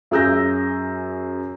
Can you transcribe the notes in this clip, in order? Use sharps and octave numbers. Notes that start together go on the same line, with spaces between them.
F#2 G#4 E6 G6 A#6